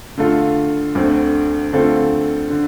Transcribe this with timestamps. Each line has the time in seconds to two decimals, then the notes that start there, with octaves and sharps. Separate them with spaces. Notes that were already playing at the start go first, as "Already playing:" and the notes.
0.18 D3 A3 F4 A4
0.95 D2 D3 A3 C4
1.73 D3 A3 C4 F4 A4
2.50 D3